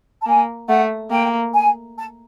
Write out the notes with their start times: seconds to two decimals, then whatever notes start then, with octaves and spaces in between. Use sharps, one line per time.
0.21 A5
0.26 A#3 G#5
0.68 A3 F#5
1.11 A#3 G5
1.54 G#5
1.96 A5